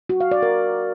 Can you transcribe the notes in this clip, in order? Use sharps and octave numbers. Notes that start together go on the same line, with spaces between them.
F#4
F5
D5
A#4